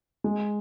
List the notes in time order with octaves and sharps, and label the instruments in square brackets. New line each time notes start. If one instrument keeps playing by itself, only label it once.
[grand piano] G#3